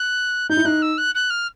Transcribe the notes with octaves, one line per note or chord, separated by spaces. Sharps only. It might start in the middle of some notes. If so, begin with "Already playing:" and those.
Already playing: F#6
D#4 G6
E4
D#4 F#6
E6
F#6
F#6
F6